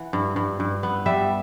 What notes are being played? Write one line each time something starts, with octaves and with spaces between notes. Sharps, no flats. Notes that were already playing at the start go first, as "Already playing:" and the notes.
Already playing: E3 F#5
G2
G2
G2
B3
G3 E5